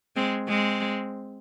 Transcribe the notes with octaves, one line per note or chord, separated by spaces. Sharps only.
G#3 C4
G#3 C4